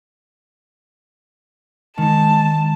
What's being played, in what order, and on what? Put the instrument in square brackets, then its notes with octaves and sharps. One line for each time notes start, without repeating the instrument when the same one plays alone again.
[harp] D#3 D#4 [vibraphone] G#3 [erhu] A5